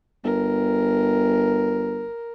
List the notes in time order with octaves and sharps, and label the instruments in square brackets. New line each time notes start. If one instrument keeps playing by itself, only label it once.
[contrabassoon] G1 [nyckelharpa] A#4